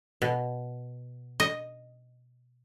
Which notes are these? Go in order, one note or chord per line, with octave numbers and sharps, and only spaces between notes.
B2
D#5